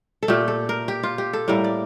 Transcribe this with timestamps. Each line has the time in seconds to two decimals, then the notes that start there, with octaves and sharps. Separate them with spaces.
0.23 A4
0.28 A#2 A3 G4
0.48 A4
0.69 A#4
0.88 G4
1.03 F4
1.18 G4
1.33 A4
1.48 A2 G3 A#3 A#4
1.64 D5